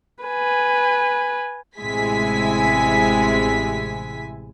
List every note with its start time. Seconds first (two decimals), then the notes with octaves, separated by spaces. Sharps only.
0.24 B4 G#5
1.78 A1 C3 G#3 E4 G#5 B6